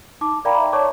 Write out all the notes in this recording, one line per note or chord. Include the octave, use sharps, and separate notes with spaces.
D#4 A5 D6
A#4 D5 F5 G5 A#5 B5
E5
C#5 D5 A5 A#5 C#6 D6